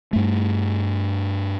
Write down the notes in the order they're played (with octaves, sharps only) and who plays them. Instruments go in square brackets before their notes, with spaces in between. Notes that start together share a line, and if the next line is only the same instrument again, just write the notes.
[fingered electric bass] G2 A3